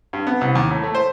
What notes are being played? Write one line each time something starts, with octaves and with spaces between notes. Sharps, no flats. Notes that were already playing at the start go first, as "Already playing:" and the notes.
G2
B3
C2
D#2
A2
A3
C5